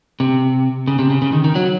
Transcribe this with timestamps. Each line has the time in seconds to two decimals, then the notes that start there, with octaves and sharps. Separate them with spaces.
0.20 C3
0.88 C#3
0.99 C3
1.10 C#3
1.22 C#3
1.33 D#3
1.44 D#3
1.55 F#3